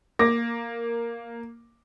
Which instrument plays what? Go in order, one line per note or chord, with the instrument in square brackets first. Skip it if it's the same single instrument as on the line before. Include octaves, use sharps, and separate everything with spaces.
[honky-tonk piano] A#3 [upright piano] D6 A#6